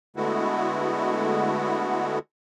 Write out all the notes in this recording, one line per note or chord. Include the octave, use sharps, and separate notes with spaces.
D3 G#3 A3 B3 E4 F#4